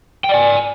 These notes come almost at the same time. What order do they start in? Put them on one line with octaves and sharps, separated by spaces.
G5 D5 G#5